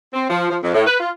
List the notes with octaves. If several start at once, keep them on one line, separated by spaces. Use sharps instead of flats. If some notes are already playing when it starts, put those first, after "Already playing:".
C4
F3
F3
F2
A2
B4
F4